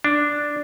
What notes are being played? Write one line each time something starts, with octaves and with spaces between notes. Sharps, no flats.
D4